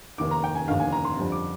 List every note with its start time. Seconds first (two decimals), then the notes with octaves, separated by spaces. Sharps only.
0.18 F1 D#2 D#3 D6
0.31 A#5
0.44 G5
0.55 G#5
0.68 F1 D#2 D3 F5
0.80 G#5
0.92 A#5
1.05 C6
1.16 F2 D3 G3 C4
1.32 D6